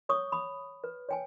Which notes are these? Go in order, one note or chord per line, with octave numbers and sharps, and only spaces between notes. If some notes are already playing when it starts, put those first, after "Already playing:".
C#5 C#6 D#6
B5 D#6
B4
C#5 G5 G#5